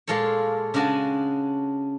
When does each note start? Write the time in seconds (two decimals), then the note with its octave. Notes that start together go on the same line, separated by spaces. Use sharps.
0.07 A#2 G#3 F4 A4 C#5
0.74 C#3 G#3 D4 F#4 G#5 A5